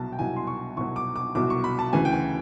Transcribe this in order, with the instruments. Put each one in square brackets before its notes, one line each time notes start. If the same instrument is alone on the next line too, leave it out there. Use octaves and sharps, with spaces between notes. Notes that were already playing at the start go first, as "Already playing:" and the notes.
Already playing: [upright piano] C2 B2 F#3 A5
G5
C2 B2 F#3 G#5
C6
C#6
C2 B2 F#3 C#6
D6
D6
C2 B2 F#3 D6
C#6
B5
A5
D2 C#3 E3 G#5
G5
G#5